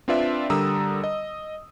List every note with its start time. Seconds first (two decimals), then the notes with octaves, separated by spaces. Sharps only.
0.08 C4 D4 F4 B4 D5 E5
0.50 D3 G3 A#4 A#5 D#6 E6
1.04 D#5